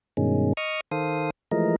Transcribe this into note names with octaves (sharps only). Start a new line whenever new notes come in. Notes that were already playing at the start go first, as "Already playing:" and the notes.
G2 B2 D#3 G#3 C#4
D#5 C#6 D#6 F6
D#3 A4 C5 F5 D#6
E3 F3 G#3 A3 A#4 D#5